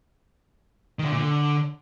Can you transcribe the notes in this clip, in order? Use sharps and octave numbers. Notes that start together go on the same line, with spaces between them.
D#3
D3
A#2
D3